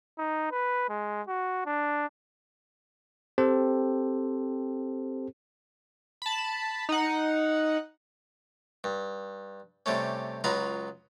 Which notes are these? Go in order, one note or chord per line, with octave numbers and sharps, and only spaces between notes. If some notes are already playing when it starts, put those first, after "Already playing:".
D#4
B4
G#3
F#4
D4
C4 G4 A4 C5
A5 B5
D#4 F#5
G2
C3 G3 A3 C#4
C#2 F#3 F4 A#5 B5